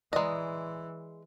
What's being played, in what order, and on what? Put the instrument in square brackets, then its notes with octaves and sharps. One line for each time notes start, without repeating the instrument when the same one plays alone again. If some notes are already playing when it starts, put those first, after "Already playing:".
[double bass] E3 [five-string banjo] G#3 D#5 [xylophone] D5 A#5